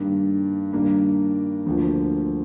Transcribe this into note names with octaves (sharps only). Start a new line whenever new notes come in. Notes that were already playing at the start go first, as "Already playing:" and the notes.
Already playing: G2 D#3 A#3 D4
G2 D#3 A#3 D4
D2 D3 F3 A#3